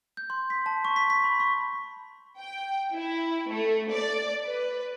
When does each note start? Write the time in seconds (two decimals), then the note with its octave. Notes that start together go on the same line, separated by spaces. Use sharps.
0.17 G6
0.30 C6
0.50 B6
0.66 A5
0.85 C#6
0.96 B6
1.10 B6
1.24 B5
1.40 C#6
2.37 G5
2.95 E4
3.50 A3
3.91 D5
4.45 B4